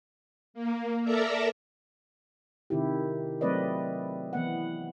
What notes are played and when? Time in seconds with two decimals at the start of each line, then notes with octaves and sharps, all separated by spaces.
0.54 A#3
1.04 A4 A#4 D5 E5 A#5
2.70 C3 D#3 E4 G4
3.41 F#3 A3 C4 B4 D5 D#5
4.33 E3 B3 F#5